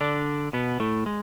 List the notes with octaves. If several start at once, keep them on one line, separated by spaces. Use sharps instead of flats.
D3 D4
B2 B3
A2 A3
G#3